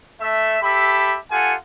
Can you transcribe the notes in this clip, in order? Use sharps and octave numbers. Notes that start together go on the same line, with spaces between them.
A3 E5
G4 A4 E5 B5
F4 G4 A4 F#5 G#5